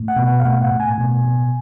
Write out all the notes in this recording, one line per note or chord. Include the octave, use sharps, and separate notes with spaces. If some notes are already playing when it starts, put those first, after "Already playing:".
Already playing: A2
F#5
B2
F#5
F5
A2 F#5
F#5
A2
G#5
B2
B2